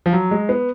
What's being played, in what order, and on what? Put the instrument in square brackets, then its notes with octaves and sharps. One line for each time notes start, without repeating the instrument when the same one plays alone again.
[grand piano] F3
F#3
G#3
B3